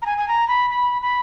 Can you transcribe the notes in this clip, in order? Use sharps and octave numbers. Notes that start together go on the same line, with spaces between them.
A#5
G#5
G#5
A#5
B5
B5
B5